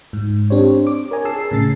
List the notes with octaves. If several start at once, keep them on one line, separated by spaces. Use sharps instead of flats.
G#2
C4 D4 G4 C5 C#5
D6
A#4 C#5 D#5 G#5 A#5
G#4 A5 E6 C7
A2 C#3 A6 C7